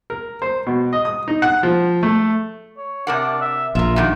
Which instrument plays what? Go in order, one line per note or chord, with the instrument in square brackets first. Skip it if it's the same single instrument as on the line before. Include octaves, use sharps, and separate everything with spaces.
[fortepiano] A#4
C5
B2
D#5
D#6
D#4
F#5
F3
A3
[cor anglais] C#5
[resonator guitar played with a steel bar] C3 A#4 F#5 [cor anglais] D4
[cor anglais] E5
[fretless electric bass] A#1 [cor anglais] F4 [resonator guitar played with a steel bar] A#4 E5
[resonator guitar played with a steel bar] G2 A#2 D#3 [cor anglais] F#4